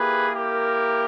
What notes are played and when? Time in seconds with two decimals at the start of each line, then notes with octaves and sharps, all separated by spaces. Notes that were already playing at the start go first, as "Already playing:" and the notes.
Already playing: A#3 E4 G4 G#4 B4
0.34 G4 A#4